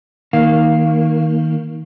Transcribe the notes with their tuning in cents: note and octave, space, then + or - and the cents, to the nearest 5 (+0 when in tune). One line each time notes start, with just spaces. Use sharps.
D#3 +20 A#3 +0 F5 +0